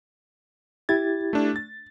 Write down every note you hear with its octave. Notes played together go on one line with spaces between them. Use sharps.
E4 G4 G#6 A6
A3 D4
A6